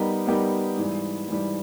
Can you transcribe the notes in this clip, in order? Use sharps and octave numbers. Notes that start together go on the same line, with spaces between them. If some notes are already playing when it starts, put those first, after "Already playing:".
Already playing: G3 B3 D#4 G4 A#4
G3 B3 D#4 G4 A#4
G#2 E3 G3
G#2 E3 G3